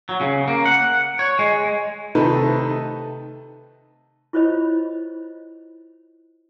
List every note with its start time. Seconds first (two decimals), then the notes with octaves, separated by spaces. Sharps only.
0.09 F#3
0.21 C#3
0.48 A#3
0.66 F#5
1.19 C#5
1.39 G#3
2.15 C3 D#3 A3 D#4 A4 B4
4.33 E4 F4 C5 C#5 D#5 B5